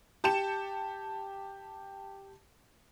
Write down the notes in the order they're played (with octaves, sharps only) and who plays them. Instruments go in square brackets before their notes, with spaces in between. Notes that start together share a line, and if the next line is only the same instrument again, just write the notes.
[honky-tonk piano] G4 A5 G6 C#7 E7